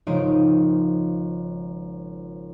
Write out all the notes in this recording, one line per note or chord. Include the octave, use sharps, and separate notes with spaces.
G#1 C#3 F3 D#4 D#5 D7